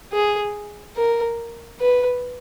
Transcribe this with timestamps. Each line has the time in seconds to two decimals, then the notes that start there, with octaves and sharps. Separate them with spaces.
0.13 G#4
0.97 A#4
1.80 B4